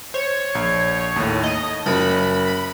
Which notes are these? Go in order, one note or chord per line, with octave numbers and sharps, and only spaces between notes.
C5 C#5
A#1 G#6
D#2 A2
D#5 A5
F#1 B5